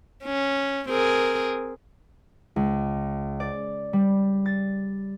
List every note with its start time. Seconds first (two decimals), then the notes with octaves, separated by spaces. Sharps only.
0.25 C#4
0.89 C4 G#4 A#4
2.56 C#2
3.40 D5
3.93 G3
4.46 A6